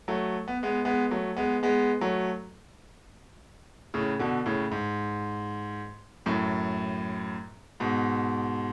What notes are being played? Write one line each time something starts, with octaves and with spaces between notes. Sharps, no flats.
F#3 A3
B3
G#3 B3
G#3 B3
F#3 A3
G#3 B3
G#3 B3
F#3 A3
A2 C#3
B2 D3
A2 C#3
G#2
F#2 A2
G#2 B2